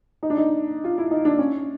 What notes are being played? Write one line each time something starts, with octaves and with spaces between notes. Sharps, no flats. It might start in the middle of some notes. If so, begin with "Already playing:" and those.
D#4
D4
D#4
F4
E4
D#4
D4
C#4